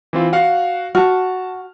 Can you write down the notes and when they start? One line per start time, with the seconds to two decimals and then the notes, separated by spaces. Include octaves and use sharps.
0.13 E3 C4 F4
0.33 F#4 F5 F#5
0.95 F#4 A5 F6